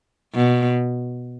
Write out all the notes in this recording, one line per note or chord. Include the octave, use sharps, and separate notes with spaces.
B2